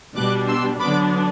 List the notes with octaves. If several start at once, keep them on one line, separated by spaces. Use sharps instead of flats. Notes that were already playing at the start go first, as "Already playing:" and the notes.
B2 G3 D4 D6 F#6
C6 E6
D3 F#3 B3 D4 B5 D6